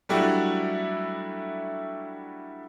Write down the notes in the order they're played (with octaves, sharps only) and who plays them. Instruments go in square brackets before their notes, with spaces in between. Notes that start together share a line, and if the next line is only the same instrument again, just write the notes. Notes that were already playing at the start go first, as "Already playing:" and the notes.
[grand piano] F#3 G3 A3 D4 E4 F#4